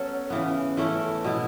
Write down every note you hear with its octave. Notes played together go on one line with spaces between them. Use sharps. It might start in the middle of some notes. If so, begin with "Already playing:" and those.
Already playing: F#3 B3 C#4 A4
C#3 E3 B3
E3 A3 C#4 E4
B2 B3 E4